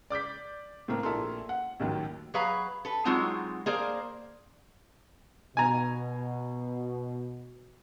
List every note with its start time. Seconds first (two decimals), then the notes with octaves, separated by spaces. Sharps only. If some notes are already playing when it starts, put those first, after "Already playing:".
0.10 D5 D6 G6 B6
0.88 A2 A3 A#3 C4
1.03 A#1 E4 A4 A#4 C6
1.49 F#5
1.80 A1 D#2 D#3 F#3
2.34 F#3 G#4 B4 F5 A#5
2.85 A4 B4
3.05 F#3 G#3 C4 D#4 F4 F#4
3.66 A#3 G#4 A#4 C5 D5
5.57 B2 G#5 A#5